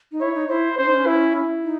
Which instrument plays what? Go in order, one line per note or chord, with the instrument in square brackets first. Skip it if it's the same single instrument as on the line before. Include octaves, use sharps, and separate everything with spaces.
[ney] D#4
[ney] E4 [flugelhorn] C#5
[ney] D#4
[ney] E4 [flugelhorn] C5
[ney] C#4 [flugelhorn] C5
[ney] D#4
C#4
[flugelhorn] E4
E4
[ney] D#4